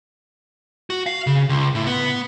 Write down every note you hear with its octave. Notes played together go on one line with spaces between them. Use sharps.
F#4
F5
C#3
C#2
A2
B3